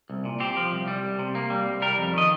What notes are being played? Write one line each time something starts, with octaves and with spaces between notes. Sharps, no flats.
C2
A#2
C4 G4
F3
C2
G3
C2
C3
A#3
G3
C2
G3 A#4
F2
D#3 D#5